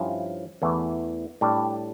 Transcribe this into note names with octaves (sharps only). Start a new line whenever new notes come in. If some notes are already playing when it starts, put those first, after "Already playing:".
Already playing: G2 F3 C#4 E4
E2 E3 A3
A2 G3 D4 G4